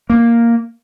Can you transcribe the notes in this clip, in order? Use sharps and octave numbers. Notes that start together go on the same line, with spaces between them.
A#3